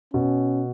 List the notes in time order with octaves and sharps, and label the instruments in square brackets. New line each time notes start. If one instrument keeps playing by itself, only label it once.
[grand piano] B2 [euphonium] C#4